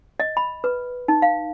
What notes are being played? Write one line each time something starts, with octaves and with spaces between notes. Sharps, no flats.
D#5
B5
B4
D#4
F5